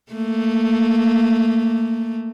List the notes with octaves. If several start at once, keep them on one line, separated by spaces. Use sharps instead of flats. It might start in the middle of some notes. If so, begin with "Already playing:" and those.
A3 A#3